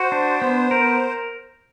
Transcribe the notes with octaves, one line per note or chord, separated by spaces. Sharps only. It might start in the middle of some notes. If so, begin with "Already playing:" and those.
Already playing: F#4 C5
D4
B3
A#4